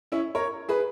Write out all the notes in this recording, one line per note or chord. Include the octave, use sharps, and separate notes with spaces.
C#4 E4
A#4 C#5
G#4 B4